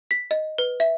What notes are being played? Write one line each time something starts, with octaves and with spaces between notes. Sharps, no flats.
B6
D#5
B4
E5